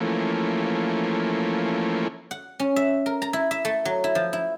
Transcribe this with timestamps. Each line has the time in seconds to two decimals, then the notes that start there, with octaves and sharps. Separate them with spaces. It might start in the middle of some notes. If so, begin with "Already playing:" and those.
0.01 E3 F3 A3 A#3 C#4
2.31 F#5
2.60 C#4
2.76 E5
3.06 A#4
3.22 A#5
3.33 E4
3.51 E5
3.65 A3
3.85 F#3
4.04 E4
4.15 F3
4.33 E4